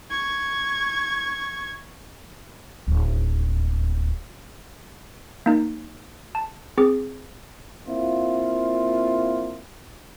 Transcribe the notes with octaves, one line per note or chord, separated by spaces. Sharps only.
C#6 G#6
D1 D#2
A#3 D#4
A5
C4 G#4 D6
A#3 C4 E4 F4